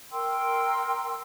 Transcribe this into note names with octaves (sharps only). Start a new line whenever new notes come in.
A#4 G5 C6 E6